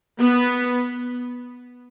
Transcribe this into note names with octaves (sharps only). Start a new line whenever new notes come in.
B3